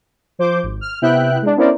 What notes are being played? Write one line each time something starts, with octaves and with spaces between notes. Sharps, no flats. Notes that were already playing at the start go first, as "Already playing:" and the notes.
F3 C5 D6 G6
G#1
F6
C3 B3 E4 E5 G5 F#6
G#3 D4
B3 C#4 E4 A#4 C5 D5